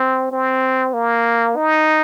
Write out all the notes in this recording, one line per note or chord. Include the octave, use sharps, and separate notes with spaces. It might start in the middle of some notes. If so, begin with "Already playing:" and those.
Already playing: C4
C4
A#3
D#4